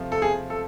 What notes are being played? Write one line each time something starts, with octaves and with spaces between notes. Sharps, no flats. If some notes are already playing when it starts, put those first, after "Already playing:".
Already playing: C3 F3 A3
A4
G#4
A4